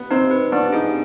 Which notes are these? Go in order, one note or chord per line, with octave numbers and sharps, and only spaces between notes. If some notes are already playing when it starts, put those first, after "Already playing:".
Already playing: B3
C4 D#4
B4
B3 D4
D#4 G#4